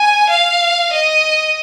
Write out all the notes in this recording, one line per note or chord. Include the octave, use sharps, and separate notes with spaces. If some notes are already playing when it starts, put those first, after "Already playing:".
Already playing: G#5
F5
D#5